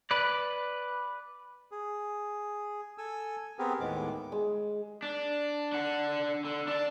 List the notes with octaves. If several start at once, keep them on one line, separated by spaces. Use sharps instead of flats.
B4 D5
G#4
A4 G#5 E6
B3 C4 G4 G#4 A#4
D#2 A2 D#3 G#3 B3 D6
G#3
D4
D4 F#5
D3
D4 A5